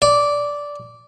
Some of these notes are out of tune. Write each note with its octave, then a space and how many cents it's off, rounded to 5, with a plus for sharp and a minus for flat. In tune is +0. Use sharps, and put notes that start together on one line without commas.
D5 -10